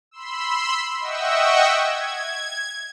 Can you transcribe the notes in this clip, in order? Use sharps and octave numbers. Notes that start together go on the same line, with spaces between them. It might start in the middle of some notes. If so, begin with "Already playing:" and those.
B5 C6 E6
D#5 E5 F#5 G5 C#6 E6
G#6